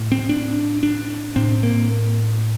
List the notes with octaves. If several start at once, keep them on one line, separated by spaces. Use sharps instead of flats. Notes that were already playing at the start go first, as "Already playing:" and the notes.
Already playing: A2
C4
D4
D4
A2 C4
A#3